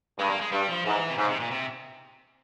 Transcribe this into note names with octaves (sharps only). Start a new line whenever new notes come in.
G2 G#3
A#3
G#3
G2 G3
F3
G#2 E3
C3
G#2 C#3
C3
A#2
C3